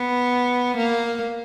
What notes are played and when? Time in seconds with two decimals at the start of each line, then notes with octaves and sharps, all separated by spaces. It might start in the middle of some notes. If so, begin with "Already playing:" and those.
Already playing: B3
0.76 A#3